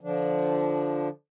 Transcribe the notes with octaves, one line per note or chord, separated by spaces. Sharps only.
D3 F3 D4